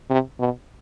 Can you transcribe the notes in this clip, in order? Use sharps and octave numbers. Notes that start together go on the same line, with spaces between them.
C3
B2